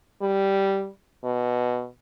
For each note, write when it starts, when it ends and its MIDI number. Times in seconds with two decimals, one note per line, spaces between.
0.22 0.88 55
1.24 1.86 47